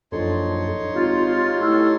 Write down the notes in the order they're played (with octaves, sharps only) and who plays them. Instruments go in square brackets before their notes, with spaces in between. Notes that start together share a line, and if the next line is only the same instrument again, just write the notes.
[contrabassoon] A#1 [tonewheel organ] F#2 A4 [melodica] D#4 C#5 C6
[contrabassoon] G#1 [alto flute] F4 [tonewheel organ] G4
[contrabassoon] A2 [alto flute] A4